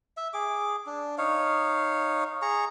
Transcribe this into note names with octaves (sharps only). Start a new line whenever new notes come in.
E5
G#4 D6
D4
D#4 C#5 F5
G#4 A#5 C#6